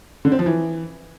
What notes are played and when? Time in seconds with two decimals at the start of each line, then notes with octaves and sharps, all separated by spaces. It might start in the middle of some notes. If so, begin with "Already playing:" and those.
0.25 D3
0.32 C4
0.39 F3
0.46 E3